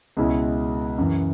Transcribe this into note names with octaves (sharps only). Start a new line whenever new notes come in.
C#2 B2 G#3 C#4 E4
F#2 C#3 E3